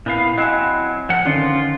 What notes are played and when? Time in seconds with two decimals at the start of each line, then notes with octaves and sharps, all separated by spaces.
0.06 A#2 B3 E4 F5
0.38 F#3 C4 E4 D#5 G#5
1.09 F#2 F3 F#5
1.25 D3 D#3 F3 C#4 F4